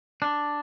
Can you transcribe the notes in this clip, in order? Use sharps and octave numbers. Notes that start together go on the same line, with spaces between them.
D4